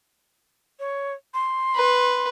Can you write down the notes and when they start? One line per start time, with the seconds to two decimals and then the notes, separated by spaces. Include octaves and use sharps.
0.80 C#5
1.34 C6
1.75 B4